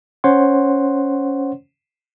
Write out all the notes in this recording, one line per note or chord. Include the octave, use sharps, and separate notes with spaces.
C#4 C5 C#5 F#5 C6